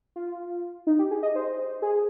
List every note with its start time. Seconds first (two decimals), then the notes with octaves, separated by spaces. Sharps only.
0.16 F4
0.87 D#4
0.99 G4
1.11 G#4
1.23 D#5
1.36 C5
1.82 G#4